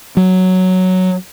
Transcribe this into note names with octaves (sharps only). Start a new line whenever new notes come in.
F#3